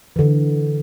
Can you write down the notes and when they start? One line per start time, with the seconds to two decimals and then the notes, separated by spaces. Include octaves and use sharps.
0.16 D3 E3